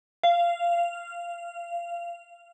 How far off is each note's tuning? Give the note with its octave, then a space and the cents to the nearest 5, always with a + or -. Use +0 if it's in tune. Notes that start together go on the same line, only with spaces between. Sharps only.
F5 -20